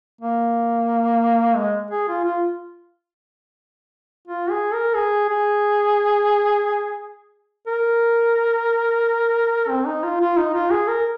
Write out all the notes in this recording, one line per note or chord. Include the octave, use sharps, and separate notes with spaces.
A#3
G#3
G#4
F4
F4
F4
G#4
A#4
G#4
G#4
A#4
C4
D#4
F4
F4
D#4
F4
G#4
A#4